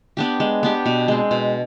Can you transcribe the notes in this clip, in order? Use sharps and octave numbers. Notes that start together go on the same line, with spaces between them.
B3 D4 G4
G#3
B3 D4 G4
B2
G#3 C4
B2